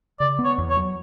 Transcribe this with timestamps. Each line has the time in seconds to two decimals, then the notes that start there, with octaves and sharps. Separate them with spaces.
0.20 C#3 D5
0.39 B3
0.45 C#5
0.58 E2
0.70 C#5
0.77 F#3